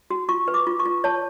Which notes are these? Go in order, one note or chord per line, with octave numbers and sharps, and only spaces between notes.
F#4
F4 C#6
B4
D6
F4
C#6
F4
C#5 A5